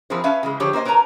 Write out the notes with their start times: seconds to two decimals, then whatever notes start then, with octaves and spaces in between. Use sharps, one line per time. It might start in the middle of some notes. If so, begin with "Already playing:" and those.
0.10 E3 F3 C4 G#4 A#4 C5
0.24 C#4 B4 E5 F5 G#5 A5
0.43 C#3 E3 G#3
0.60 D3 F3 G4 G#4 C5 C#5
0.73 A#3 A#4 C5 D#5 G#5
0.85 A#4 B4 C#5 A5 A#5